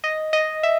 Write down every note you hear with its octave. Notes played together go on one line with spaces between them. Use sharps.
D#5
D#5
E5